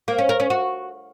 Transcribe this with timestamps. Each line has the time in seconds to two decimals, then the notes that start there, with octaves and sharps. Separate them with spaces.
0.08 A#3
0.18 C#4
0.29 A#4
0.40 C#4
0.50 F#4